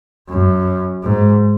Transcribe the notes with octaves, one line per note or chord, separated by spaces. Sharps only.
F#2
G#2